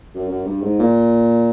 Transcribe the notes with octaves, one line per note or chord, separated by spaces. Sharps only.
F#2
F#2
G2
G#2
A#2